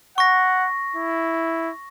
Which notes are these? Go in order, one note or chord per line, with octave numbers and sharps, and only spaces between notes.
F#5 C#6 A#6
E4